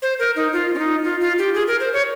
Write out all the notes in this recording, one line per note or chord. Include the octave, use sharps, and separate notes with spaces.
C5
A#4
D#4
F4
C#4
D#4
F4
F4
G4
G#4
A#4
C5
C#5